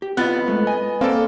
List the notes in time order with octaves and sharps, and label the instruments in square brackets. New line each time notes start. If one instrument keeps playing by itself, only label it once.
[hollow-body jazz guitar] G4
[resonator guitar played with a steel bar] B3 [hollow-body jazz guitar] C4 F4 D#5 [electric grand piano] F#6 A6
[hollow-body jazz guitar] G#2 G#3 A3
[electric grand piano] D#5 [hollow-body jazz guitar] G#5
[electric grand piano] A#3 A4 [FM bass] C4 [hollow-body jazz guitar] D5 F5